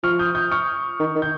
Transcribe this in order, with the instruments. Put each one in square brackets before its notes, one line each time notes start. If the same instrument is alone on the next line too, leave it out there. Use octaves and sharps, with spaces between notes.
[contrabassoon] F3 [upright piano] C#6 F6
[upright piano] D#6 G6
D#6 G6
C#6 F6
[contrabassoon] D#3
D#3
[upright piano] G6